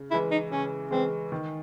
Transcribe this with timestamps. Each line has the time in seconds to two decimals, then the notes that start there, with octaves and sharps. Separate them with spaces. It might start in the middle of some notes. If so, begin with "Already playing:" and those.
Already playing: C#3
0.11 E3 G#3 E4
0.31 D#4
0.51 C#3 C#4
0.91 E3 G#3 C4
1.32 D#3